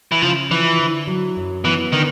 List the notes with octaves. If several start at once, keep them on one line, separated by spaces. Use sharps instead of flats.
E3
C#3 F3
E3 F3
D3
F#3
F#2
E3 B3
D3 D#3